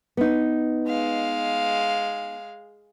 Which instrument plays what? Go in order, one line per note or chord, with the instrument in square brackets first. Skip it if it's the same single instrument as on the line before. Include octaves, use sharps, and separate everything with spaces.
[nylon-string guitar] B3 D#4
[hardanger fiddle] G#3 F5